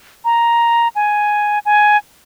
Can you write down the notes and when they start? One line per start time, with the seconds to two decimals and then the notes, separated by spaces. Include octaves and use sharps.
0.25 A#5
0.95 G#5
1.66 G#5